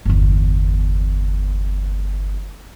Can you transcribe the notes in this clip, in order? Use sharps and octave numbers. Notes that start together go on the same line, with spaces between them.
G1 E2